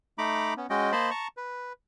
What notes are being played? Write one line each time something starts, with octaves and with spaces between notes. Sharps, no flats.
A3 D#4 A#5 B5 D6
B3 C#4
G#3 C#4 F#4 D#5 G5
A#3 C5 D#5 A5 B5 C6
A5 A#5 C#6
B4